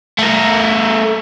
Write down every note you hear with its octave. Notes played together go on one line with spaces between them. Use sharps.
A3 A#4